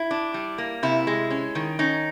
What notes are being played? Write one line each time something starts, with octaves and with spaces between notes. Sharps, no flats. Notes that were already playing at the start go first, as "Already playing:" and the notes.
Already playing: E4
D4
G3
A#3
C3 E4
G#3
C#4
D#3
C#4 D#4